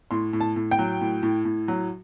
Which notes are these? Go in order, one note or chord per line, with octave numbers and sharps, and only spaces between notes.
A2 C6
A2
A5
A2
G5
F#3
A2
A2
A2
F#3